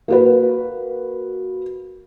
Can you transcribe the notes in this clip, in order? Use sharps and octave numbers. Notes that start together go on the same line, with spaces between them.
A#3 F#4 B4